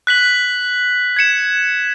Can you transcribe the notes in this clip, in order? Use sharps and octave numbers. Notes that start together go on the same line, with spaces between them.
F#6 B6 F#7
G#6 C#7 E7